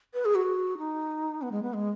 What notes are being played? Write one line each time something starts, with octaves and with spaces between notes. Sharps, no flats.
B4
G#4
F#4
D#4
B3
G#3
B3
G#3